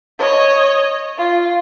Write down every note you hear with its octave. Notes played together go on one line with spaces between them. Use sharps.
C#5 D#5
F4